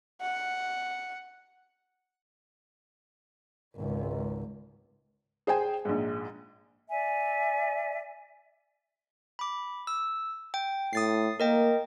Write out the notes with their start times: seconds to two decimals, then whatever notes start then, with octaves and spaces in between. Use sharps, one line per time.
0.21 F#5
3.76 G#1 C#2
5.47 G#4 C5 G5 G#5
5.85 A#1 G#2
6.90 D5 E5 G#5
9.39 B5 D6
9.87 E6
10.54 G5
10.93 A2 D#6 A6 C7
11.40 A#3 A#4 D#5 G5